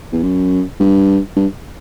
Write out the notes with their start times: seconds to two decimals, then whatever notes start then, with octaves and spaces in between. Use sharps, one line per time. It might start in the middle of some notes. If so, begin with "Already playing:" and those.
0.12 E2
0.23 F#2
0.80 G2
1.36 G2